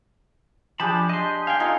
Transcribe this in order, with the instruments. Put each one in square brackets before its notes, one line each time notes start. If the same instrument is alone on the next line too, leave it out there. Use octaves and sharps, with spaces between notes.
[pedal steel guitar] F3 A5 B5 [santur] D4 G4 G#4
[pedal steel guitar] D#5 C6
[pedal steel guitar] F5 G5 [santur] G#5
[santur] D#4 F4 [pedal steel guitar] A4 F5